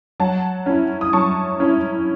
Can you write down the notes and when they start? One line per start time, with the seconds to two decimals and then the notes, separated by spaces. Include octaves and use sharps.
0.20 F#3 F#5 A5
0.66 C#4 E4
1.01 D#6
1.13 F#3 A5 C#6
1.60 C#4 E4